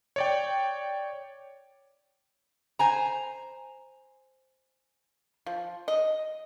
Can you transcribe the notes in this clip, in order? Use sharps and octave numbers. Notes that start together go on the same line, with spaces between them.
C#5 D5 G5
C5 G#5 A#5
F3
D#5